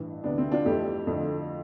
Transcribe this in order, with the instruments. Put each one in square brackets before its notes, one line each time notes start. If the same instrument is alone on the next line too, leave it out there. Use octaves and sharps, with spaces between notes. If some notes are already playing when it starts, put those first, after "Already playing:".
Already playing: [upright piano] A1 G2 E3
D2 C3 E3 B3 D4
C4 E4
D4 F4
F2 E3 A3 E4 G4
F2 D3 F3 A3